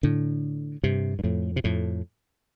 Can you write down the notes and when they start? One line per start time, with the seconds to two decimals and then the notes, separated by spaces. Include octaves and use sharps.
0.03 A2 D3
0.84 G2 C3
1.19 G2
1.24 F2 A2
1.56 C3
1.64 F2 A2